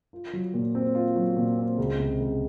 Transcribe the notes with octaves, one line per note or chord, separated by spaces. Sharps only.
F4
F#3
A#2
C4
F4
F#3
A#2
C4
C#2
C3
C#2